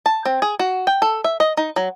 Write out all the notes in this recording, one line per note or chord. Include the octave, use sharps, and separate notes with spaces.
A5
C4
G#4
F#4
G5
A4
E5
D#5
D#4
F#3